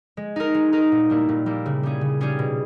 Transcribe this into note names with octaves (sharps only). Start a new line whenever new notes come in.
G#3
D#4 A#4
G#3
D#4 A#4
A#2
G3 A#3 E4
A#2
G3 A#3 E4
C#3
G3 C#4 G#4
C#3
G3 C#4 G#4
B2